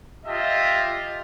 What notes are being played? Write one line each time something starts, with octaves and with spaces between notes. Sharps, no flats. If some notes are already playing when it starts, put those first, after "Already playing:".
F4 G4 D#5 E5 A5